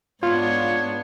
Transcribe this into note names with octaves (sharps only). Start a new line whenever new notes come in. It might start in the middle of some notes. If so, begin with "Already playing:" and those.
G#2 B3 D4 F4 C#5